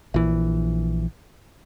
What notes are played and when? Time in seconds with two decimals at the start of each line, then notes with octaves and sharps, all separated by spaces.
0.14 A#1 E3